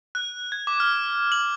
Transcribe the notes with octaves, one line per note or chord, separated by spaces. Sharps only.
F#6
G#6
D6
F6
F#7